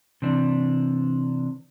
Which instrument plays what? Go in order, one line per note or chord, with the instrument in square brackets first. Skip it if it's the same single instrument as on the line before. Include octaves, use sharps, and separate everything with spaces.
[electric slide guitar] C3 E3 D4